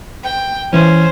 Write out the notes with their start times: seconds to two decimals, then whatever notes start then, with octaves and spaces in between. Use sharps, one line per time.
0.23 G5
0.73 E3 C#4 C5